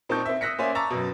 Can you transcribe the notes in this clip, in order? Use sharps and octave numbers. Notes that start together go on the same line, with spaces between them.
A#2 C4 D#4 A5 C#6 G6
C4 E5
D#6 E6 F#6 A#6 B6 C#7
A#3 C#4 C5 D5 E5 G#5
A5 A#5 C#6 D6 E6 A6
F#2 B2